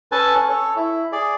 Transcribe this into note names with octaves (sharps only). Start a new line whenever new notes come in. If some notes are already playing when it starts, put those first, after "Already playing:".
C#4 A4 B4 G#5 A5
C#4
A4 C#5
E4
G#4 D5